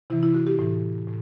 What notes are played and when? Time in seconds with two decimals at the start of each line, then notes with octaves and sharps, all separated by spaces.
0.10 C3 E3 E4
0.23 E4
0.34 F#4
0.47 G4
0.59 A2 E3
1.07 A2